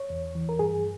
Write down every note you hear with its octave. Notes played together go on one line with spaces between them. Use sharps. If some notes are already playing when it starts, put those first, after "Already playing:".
Already playing: C#5
E2
E3
A#4
G2 G#4